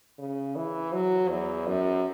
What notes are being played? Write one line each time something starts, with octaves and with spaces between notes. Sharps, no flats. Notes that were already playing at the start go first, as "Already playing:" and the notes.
C#3
E3
F#3
E2
F#2